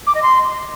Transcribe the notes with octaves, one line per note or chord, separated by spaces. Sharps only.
D6
D#5
C6